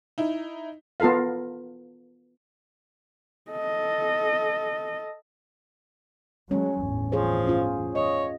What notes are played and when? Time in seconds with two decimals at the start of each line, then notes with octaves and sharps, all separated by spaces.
0.18 D#4 E4
1.00 B3 F4 A4 A#4 F5
3.51 A4 D#5
6.51 F#3 G#3 A3 C#4
6.81 G1 E2 A2
7.12 F3 G#4 C5 C#5
7.47 C#4 F4
7.95 C#5 D#5